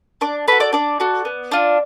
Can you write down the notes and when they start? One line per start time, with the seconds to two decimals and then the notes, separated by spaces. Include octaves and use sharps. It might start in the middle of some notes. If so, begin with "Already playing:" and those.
0.21 D4 D5 D6
0.48 F#4 A4 B4 B5
0.60 D5 D6
0.73 D4 D5 D6
1.00 F#4 A4
1.25 B3
1.51 D4 F4